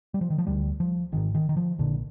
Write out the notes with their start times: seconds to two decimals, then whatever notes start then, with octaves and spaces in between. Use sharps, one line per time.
0.14 G3
0.21 F3
0.30 D#3
0.38 F3
0.47 D2 D3 G3
0.80 F3
1.12 G#1 G#2 D#3
1.35 D#3
1.49 D#3
1.57 F3
1.79 A#1 A#2 D3